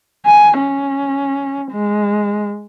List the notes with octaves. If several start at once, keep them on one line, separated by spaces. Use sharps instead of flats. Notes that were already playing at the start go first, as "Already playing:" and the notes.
G#5
C#4
G#3